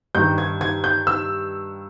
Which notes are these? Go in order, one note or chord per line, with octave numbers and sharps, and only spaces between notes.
G2 D#3 G3 G6
G#6
G#6
G6
E6